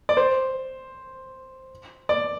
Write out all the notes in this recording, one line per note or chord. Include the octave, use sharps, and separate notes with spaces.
D5
C5
D5